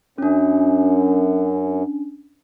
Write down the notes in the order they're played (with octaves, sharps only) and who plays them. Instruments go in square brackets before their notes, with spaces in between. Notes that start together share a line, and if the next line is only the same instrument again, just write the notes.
[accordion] F#2 [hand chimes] C#4 D4